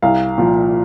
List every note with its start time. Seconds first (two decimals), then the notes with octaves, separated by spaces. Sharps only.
0.02 C2 F5
0.38 A#2 F3